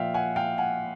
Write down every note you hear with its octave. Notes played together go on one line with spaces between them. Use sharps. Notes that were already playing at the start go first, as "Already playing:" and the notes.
Already playing: A#2 F3 E5 F5 G5
F#5 G#5
F5 G5
F#5 G#5